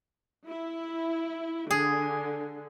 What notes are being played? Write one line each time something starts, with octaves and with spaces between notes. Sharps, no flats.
E4
D3 G#4